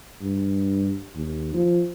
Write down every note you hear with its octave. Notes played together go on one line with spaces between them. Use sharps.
G2
D#2
F3